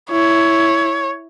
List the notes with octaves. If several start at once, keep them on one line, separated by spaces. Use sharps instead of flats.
E4 C#5